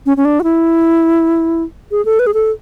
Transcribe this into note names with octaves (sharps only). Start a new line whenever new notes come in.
C#4
C#4
D4
F#4
E4
G#4
A4
B4
G#4
A4